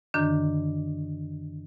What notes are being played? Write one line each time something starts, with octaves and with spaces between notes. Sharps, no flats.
F#2 D3 D#3 D4 G6